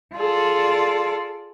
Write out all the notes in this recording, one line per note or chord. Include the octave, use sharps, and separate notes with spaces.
F4 G#4 A4 D5